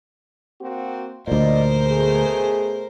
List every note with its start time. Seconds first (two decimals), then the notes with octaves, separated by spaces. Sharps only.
0.61 A#3 C4 F#4
1.27 D2 A#2 A#4 C5 D5 D#5
1.86 B2 A3 G#4